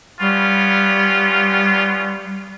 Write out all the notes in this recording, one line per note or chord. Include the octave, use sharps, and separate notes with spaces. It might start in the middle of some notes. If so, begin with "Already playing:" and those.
G3 B3 C#4 F4